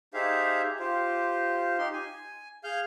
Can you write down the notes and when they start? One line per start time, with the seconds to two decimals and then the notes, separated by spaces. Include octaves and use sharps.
0.14 D#4 G4 G#4 C5 E5 F5
0.80 F4 G4 C5
1.78 D#4 G4 C6
1.93 G#5
2.64 G#4 F5 F6 G6